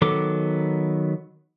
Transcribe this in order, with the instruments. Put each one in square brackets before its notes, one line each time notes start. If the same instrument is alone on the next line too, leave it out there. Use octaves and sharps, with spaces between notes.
[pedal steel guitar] D#3 F#3 B3 A4 D6